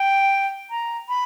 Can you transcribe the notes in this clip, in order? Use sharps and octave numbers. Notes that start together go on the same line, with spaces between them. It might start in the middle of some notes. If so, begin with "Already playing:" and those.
Already playing: G5
A#5
B5